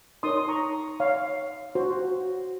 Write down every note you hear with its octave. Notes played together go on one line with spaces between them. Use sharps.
D#4 A#4 C#5 C6 D#6
A#5 C#6
C#5 F5
F#4 C5